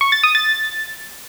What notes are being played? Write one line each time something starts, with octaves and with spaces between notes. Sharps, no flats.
C#6
A6
D#6
A6